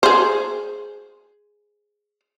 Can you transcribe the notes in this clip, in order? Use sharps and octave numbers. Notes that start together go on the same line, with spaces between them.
G#4 C5